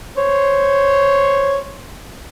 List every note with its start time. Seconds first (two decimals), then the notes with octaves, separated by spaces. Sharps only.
0.17 C5 C#5